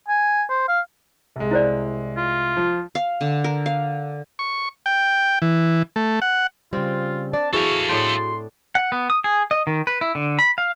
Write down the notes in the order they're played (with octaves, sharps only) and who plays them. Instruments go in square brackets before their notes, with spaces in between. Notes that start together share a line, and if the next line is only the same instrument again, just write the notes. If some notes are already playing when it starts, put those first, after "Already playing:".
[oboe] G#5
C5
F5
[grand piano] C2 G#3
[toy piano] E4 C5 D5
[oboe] F4
[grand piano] F3
[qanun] F5
D3
A#4
F5
[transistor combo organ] C#6
G5
E3
A3
F#5
[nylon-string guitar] C#3 G3 [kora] C4 [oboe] F4
[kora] D4 [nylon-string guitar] D5 [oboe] A5
[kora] E3 [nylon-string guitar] F#4 G#4 [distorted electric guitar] A4 F5 [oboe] C#6
[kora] A2 D4 G5 [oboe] C6
[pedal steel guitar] F#5
B3
D#6
G#4
D#5
D#3
B4
E4
D3
B5
F5